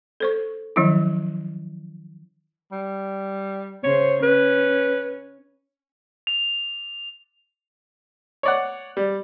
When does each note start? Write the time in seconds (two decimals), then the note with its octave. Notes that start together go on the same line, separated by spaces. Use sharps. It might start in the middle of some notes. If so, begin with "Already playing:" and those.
0.20 A4 C5 C#6
0.76 D#3 F3 F#3 C#4 E4
2.71 G3
3.84 C#3 C5 C#5
4.23 C#4 B4
6.27 F7
8.43 C#5 D5 F#5
8.97 G3